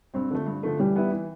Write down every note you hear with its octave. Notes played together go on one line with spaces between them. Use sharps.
G2 C4
D3 F3 A3
G2
D3 F3 A3
E3 G3
B3 E4
E3